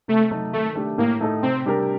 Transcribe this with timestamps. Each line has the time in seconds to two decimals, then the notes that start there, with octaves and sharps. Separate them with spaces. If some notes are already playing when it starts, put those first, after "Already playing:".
0.08 C3 A3
0.31 F#3 A3 D#4 F#4
0.53 D#3 A3
0.75 A3 D4 G4
0.98 A2 A#3
1.21 A3 D#4 A4
1.43 C3 C4
1.66 G3 D4 G4 A#4